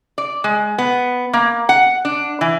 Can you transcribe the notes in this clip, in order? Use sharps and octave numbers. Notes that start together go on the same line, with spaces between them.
D5
G#3
B3
A#3
F#5
D4
E3